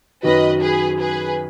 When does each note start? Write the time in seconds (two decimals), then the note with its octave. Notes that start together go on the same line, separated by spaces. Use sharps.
0.23 F#2 D#3 F#3 B4 D#5
0.61 G#4 B4
1.00 G#4 B4